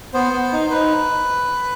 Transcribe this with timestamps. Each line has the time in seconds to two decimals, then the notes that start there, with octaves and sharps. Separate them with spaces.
0.14 B3 C5
0.33 B3
0.52 D#4
0.71 D#4 B4